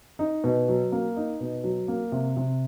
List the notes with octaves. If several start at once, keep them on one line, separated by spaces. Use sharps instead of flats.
D#4
B2
F#3
A#3
D#4
B2
F#3
A#3
C3
C3